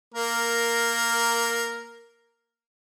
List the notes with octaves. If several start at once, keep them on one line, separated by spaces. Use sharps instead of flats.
A#3 A#4